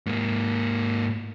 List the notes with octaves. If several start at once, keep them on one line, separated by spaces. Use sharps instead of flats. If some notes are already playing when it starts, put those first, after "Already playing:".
G#2 A#3